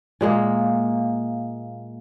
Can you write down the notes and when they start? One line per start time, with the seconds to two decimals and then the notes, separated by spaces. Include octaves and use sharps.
0.21 A#2 G#3 A#3